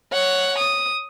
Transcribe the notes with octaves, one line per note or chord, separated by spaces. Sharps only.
C#5 F#5
D#6